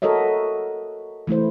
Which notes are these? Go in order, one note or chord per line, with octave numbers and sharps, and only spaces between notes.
F#4 A4 A#4 C#5 D#5 E5
E3 A3 E4 C5